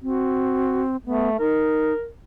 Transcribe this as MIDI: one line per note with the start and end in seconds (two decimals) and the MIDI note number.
0.02 0.96 60
0.02 0.82 66
1.06 1.37 57
1.06 1.29 59
1.39 1.93 63
1.39 2.07 70